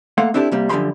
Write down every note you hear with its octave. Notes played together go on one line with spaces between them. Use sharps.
A3 A#3 A4 F5 F#5 C6
C4 D4 E4 G4 A4
C3 G3 A#3
F#2 D3 F3 G4 B5 C6